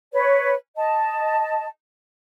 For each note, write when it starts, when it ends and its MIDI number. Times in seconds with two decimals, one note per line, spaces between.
0.13 0.53 71
0.13 0.53 73
0.76 1.66 75
0.76 1.66 81